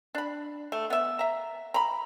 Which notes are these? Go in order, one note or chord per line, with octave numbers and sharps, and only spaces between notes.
D4 B5
A3
B3 E5
E5 A#5
A#5 B5